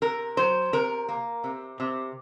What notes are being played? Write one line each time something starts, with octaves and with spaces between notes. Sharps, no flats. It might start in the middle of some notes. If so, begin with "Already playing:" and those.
C3 A#4
F#3 C5
C3 A#4
A#3
C3
C3